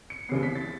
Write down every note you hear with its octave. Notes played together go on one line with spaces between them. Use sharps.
C#7
D#2 C#3 E3 G3 B3 C7
B6
A6